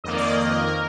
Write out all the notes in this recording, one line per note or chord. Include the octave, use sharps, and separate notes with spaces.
F2 D#3 A#3 D#5
D5
D#5
D#5
A#4
A#4